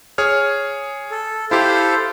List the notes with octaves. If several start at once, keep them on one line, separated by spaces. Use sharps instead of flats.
G#4 C#5 F6
A4
E4 G4 A4 C5 F5